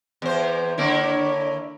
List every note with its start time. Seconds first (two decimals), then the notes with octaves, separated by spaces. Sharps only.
0.22 E2 C5
0.78 D3 A#3 D4 E4 C#5